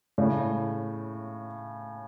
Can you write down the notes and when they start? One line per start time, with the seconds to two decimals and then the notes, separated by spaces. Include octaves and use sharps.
0.18 A2 C#3